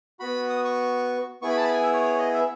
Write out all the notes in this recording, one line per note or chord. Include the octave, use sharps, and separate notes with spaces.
B3 F#4 B5
D#6
C#6
B3 E4 G#4 C#6
B5
A5
B5
G#5
E5
C#5
C#5
D#5
E5